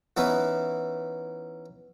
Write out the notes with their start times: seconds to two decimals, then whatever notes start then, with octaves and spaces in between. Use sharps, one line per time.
0.17 E3 B3 C#4 D#4 E4 B4